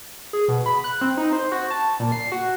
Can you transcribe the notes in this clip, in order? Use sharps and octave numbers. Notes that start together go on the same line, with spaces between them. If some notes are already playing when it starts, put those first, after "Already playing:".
G#4
B2
B5
F#6
C4
D#4
C5
F#4
A5
A#2
C7
F#4